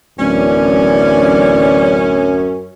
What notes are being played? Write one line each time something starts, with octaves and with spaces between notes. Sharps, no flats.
D1 F#2 D3 E3 C#4 D5